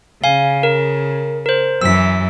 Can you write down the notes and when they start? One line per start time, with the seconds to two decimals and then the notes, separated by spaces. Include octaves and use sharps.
0.24 C#3 F5 G#5
0.63 A#4
1.46 A#4 C5
1.81 F#2 E3 E6 B6